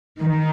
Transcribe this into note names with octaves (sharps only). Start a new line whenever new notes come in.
D#3